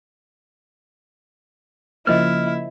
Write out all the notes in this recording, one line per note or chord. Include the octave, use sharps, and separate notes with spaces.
C#3 F3 A#3 E4 C5 D#5 F6